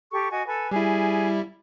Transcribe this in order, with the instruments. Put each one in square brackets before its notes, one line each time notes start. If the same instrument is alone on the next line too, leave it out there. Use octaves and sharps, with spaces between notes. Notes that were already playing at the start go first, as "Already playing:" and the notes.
[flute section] G4 A4 C#6
F#4 D#5 G#5
A4 B4 G#5
[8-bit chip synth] G3 E4 [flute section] G#4 G#5